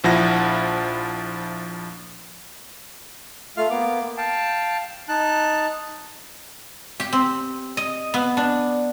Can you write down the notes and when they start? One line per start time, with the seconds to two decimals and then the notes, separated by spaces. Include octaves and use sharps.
0.04 A#1 F3 E4 F#5 A#6
3.57 A3 F4 F5 F6
3.70 A#3 B3 D6
4.17 F5 G5 A5
5.09 D#4 A5 F#6
7.00 G4
7.13 C4
7.77 D#5
8.14 B3
8.37 D4